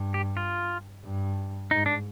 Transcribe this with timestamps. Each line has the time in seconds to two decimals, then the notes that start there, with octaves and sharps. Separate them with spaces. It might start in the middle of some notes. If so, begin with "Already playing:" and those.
Already playing: G2
0.14 G4
0.37 F4
1.04 G2
1.71 G#2 D#4
1.86 D4